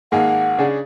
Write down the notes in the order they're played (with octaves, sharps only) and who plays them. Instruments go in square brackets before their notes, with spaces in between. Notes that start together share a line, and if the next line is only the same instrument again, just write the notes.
[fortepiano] G#1 A#3 G#4 [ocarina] F#5
[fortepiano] C#3 D4 G#4